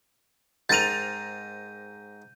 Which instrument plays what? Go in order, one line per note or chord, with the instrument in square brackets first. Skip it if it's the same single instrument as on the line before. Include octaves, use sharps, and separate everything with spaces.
[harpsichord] G#2 C4 A#4 [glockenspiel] G6 D#7 [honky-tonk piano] A6 F7